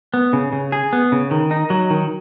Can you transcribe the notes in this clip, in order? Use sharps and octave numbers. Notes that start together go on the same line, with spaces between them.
B3
C#3
C#3
G#4
B3
C#3
D#3
D#4
F#3
D#3